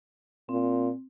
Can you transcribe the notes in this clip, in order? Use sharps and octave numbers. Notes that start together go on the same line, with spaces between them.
A#2 C4